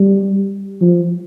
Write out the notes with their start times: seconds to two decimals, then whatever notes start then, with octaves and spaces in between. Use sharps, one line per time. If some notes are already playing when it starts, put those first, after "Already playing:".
Already playing: G3
0.81 F3